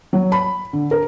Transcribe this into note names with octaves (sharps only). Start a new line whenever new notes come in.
F#3
B5
D3
A#4